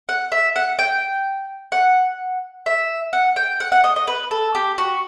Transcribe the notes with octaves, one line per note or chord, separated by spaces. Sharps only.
F#5
E5
F#5
G5
F#5
E5
F#5
G5
F#5
F#5
D#5
D#5
B4
A4
G4
F#4